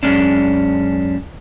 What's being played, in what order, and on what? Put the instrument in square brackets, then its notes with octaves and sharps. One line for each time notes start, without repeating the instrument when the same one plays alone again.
[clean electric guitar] F#2 G#3 C#4 D4